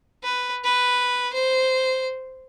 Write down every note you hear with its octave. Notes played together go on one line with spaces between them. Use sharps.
B4
B4
C5